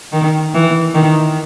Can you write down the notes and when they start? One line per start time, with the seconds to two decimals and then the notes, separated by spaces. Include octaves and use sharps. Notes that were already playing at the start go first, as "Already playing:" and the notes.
0.13 D#3
0.54 E3
0.95 D#3